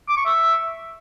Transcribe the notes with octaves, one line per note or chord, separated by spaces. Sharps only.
D6
C#6
E5